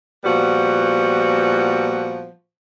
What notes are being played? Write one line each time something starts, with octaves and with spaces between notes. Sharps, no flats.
A#2 F3 G3 B3 F#4